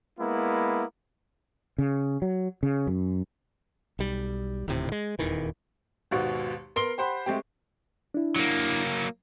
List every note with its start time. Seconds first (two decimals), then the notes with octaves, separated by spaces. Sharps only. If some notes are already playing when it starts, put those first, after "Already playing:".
0.19 G#3 A#3 B3 E4
1.78 C#3
2.22 F#3
2.63 C#3
2.87 F#2
3.99 B1 G3
4.68 D#1 D2 A2 C3
4.92 G#3
5.19 D#1 E2 D#3 E3
6.11 G#1 D#2 B2 F#5
6.76 B3 A#4 C6 C7 G7
6.98 G4 C5 F#5 B5
7.26 G#3 A3 C4 G4
8.14 D4 E4
8.36 F#3 A#3